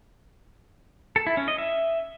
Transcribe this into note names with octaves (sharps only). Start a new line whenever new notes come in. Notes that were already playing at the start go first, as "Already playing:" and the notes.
A4
E4
C#4
D#5
E5